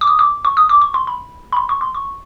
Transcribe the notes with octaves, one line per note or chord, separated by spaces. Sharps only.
D6
D#6
D6
C#6
D#6
D6
C#6
C6
B5
B5
C6
C#6
C6
C#6